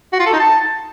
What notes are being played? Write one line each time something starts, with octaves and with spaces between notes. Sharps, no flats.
F#4
F4
A4
D#4
A5